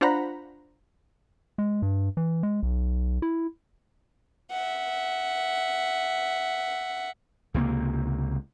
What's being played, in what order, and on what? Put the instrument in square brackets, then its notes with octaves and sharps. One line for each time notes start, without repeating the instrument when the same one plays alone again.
[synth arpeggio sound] D4 F4 C5 F#5 A#5 B5
[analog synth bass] G#3
G2
E3
G#3
B1
E4
[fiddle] E5 F#5
[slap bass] C#2 C3 G3 A#3